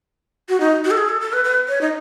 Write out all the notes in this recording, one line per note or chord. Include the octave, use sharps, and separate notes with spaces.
F#4
D#4
F#4
A4
G#4
A4
A4
B4
B4
C#5
D#4